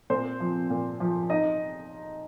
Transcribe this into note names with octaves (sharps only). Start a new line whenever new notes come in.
A#2 C4 C5
F3
A#2
F3
D#4 D#5